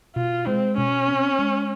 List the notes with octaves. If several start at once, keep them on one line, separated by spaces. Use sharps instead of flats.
B2 F4
G#3 C4
B2 C#4
C4
G#3